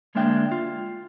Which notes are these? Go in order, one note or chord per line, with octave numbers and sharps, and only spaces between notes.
D2 G#3 A#3 D4 E5 G5
F4